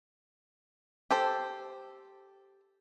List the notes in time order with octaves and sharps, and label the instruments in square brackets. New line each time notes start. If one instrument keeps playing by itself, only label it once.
[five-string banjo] G4 A4 C5